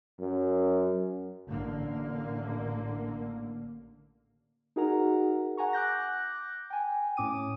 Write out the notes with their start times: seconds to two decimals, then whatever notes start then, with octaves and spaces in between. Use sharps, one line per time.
0.20 F#2
1.49 A1 A2 D3 A#3
4.76 D#4 F#4 G#4 A#4 F#5 A#5
5.57 F#5 G#5 A#5 C#6
5.73 D6 F#6 G6 A#6
6.70 G5 G#5
7.17 A2 C#4 D6 D#6 D#7